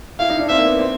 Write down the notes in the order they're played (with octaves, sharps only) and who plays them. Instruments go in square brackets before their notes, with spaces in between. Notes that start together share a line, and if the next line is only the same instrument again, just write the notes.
[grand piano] E4 [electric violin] F5
[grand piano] D#4
D4
[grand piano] C4 [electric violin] E5
[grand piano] A#3
B3
C4